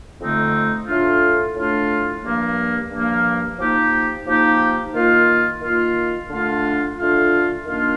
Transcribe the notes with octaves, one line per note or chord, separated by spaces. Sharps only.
F2 D3 A3 C4 D#4
A2 A3 D4 F4
A2 A3 D4 F4
G2 F3 A#3
G2 F3 A#3
F3 A#3 D#4 G4
F3 A#3 D#4 G4
D#3 A#3 F4
D#3 A#3 F4
D3 A3 D4 F4
D3 A3 D4 F4
D#3 A#3 D4 F4